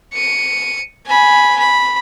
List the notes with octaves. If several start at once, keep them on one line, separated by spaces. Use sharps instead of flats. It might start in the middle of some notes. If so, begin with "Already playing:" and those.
C#7 D#7
G#5 B5
B5